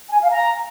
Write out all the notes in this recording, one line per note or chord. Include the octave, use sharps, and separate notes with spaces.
G#5
F5
A#5